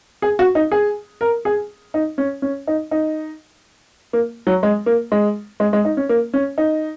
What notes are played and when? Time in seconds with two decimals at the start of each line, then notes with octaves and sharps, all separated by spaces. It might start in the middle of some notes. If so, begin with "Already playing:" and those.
0.22 G#4
0.39 F#4
0.55 D#4
0.72 G#4
1.21 A#4
1.45 G#4
1.94 D#4
2.18 C#4
2.42 C#4
2.67 D#4
2.91 D#4
4.13 A#3
4.47 F#3
4.63 G#3
4.86 A#3
5.12 G#3
5.60 G#3
5.73 G#3
5.85 D#4
5.97 C#4
6.09 A#3
6.34 C#4
6.58 D#4